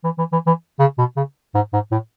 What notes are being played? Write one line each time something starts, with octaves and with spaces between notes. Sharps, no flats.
E3
E3
E3
E3
C#3
B2
C#3
G#2
G#2
A2